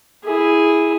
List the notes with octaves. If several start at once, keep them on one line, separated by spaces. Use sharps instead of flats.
E4 G#4